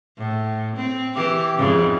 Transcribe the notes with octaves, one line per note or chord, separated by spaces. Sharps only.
A2
C4
E3 G4
F2 G#2 C#3